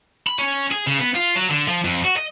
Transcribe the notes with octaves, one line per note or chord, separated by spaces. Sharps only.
B5
C#4
G#4
C#3
B3
F4
F#3
D3
F3
F2
F#4
D#5